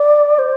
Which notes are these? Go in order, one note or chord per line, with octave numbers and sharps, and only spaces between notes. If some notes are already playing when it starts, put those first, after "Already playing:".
Already playing: D5
C5